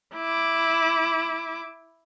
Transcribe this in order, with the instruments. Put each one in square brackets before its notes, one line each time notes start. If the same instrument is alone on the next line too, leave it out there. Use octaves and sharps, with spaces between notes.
[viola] E4 D6